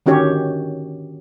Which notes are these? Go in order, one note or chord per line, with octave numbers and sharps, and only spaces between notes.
D3 D#3 C#4 F#4 G4 C#5